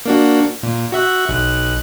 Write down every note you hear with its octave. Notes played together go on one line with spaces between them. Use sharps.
A#3 D4 F#4
A#2
F#4 E5 F#6
B1 F#6